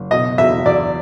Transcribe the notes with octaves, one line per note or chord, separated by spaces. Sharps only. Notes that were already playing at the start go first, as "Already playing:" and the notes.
Already playing: F#1
B2 D#5
E2 E5
E2 D5